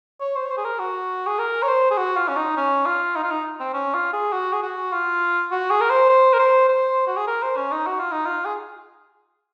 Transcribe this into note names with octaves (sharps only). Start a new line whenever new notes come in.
C#5
C5
C#5
C5
G#4
A#4
F#4
G#4
A#4
C#5
C5
G#4
F#4
F4
C#4
D#4
C#4
F4
D#4
F4
D#4
C4
C#4
F4
G#4
F#4
G#4
F#4
F4
F#4
G#4
A#4
C5
C5
A#4
C5
C5
F#4
G#4
A#4
C5
C#4
D#4
F#4
F4
D#4
F4
G#4